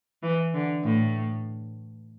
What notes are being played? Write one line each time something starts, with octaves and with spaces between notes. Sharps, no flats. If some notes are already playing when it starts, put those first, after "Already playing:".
E3
D3
A2